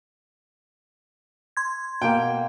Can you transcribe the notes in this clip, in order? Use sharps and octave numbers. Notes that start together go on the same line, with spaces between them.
C6 G#6
B2 A#3 G5